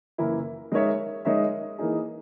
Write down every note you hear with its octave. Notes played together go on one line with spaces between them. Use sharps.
F#2 C#3 E3 A#3 E4
G#3 D#4 A#4 C#5 E5
G#3 D#4 A#4 C#5 E5
E3 A#3 D#4 G#4